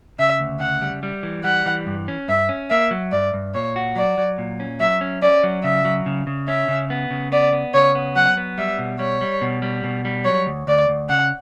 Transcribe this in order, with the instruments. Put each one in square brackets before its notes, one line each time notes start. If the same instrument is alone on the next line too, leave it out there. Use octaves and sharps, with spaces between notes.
[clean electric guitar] C#3 [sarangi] E5
[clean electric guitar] D2
[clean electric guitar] C#3 [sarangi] F#5
[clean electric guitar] G3
G3
E3
[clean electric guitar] G3 [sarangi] F#5
[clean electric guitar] E3
G2
C#4
[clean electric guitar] G2 [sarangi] E5
[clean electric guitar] C#4
[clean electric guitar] A#3 [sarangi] E5
[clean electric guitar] F#3
[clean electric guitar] G2 [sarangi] D5
[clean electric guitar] G2
[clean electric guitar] A#2 [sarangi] C#5
[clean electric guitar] F#4
[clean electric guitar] F#3 [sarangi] D5
[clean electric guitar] F#3
A#2
C#4
[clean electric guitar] F#3 [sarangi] E5
[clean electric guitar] C#4
[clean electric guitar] C#4 [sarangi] D5
[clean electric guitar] F#3
[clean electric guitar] C#3 [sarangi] E5
[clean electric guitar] F#3
C#3
C#3
[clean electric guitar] C#4 [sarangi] E5
[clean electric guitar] C#3
B3
C#3
[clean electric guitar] B3 [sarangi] D5
[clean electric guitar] B3
[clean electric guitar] C#3 [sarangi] C#5
[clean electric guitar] B3
[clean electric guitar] F#3 [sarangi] F#5
[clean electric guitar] B3
[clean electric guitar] G3 [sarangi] E5
[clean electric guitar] B2
[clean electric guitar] G3 [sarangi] C#5
[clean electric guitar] G3
B2
G3
B2
G3
[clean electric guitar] F#3 [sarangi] C#5
[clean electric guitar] D2
[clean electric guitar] D2 [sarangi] D5
[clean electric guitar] D2
[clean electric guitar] C#3 [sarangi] F#5